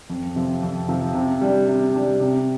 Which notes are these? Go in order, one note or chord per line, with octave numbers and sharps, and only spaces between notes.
F2
C3 F3 C4
F2
C3 F3 C4
C3
G3 D4
C3
G3 D4
C3